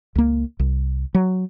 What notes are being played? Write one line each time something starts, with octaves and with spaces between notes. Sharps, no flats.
C#2 A#3
C2
F#3